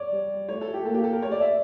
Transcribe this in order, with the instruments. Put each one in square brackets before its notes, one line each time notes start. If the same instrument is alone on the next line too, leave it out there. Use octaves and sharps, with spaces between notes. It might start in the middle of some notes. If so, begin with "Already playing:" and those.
Already playing: [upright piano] C#5 D5
[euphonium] G3
[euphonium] A3 [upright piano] C#5
[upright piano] A4
G4
[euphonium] A#3 [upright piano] A4
[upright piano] G4
A4
A#4
[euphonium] A3 [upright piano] C#5
[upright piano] D5
E5